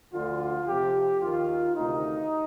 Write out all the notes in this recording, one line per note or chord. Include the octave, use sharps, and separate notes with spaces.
D2 D3 F3 F4
F2 C3 F3 G4
D#2 D#3 F4
D2 C3 D#3 D#4